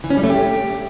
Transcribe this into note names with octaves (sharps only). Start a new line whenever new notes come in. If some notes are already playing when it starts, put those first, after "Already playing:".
E3
C#4
G3
A3
G4